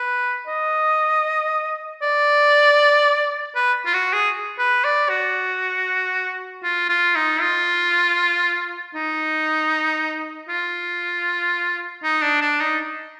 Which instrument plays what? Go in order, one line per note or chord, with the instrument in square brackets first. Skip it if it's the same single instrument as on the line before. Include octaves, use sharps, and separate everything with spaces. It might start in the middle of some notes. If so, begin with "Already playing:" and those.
Already playing: [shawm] B4
D#5
D5
B4
F4
F#4
G#4
B4
D5
F#4
F4
F4
D#4
F4
D#4
F4
D#4
D4
D4
D#4